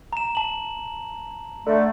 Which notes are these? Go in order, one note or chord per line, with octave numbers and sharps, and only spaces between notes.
A#5 E7
A5 F#7
D3 A3